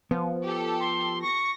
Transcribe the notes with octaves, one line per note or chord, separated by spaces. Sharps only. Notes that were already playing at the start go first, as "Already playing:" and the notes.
F3 B3
G4 A4
C6
C#6 A#6